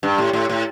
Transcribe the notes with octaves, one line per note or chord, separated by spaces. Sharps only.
G2
A2
A2
A2